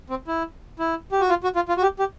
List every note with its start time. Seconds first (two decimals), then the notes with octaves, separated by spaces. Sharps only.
0.10 C4
0.27 E4
0.79 E4
1.12 G4
1.21 F#4
1.29 F4
1.44 F#4
1.56 F4
1.69 F4
1.77 F#4
1.82 G4
1.99 G4